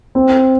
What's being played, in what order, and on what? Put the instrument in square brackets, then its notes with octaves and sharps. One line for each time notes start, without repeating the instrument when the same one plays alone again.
[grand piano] C4